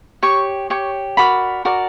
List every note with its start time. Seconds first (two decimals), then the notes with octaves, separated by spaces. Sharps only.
0.23 G4 C#5 C#6
0.70 G4 C#5
1.17 F#4 A#4 D5 B5
1.65 F#4 A#4 D5